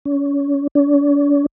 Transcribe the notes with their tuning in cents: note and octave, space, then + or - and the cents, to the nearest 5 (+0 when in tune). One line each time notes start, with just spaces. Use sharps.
C#4 +30
D4 -45